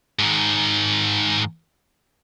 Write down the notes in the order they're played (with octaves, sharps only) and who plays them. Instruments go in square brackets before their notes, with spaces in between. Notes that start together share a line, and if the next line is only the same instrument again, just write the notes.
[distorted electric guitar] G#2 D#3